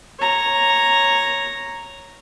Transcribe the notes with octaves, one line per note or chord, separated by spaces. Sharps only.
C#5 A#5